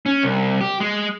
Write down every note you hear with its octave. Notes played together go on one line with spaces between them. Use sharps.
C#4
C2
G4
G#3